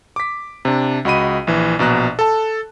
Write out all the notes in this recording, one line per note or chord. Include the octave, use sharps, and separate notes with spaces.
D6 B6
C3 D4
C#2 F#4 D#5 B5 D#7
A#1 E3
A#1 B2 A#5 F#6
A4 A5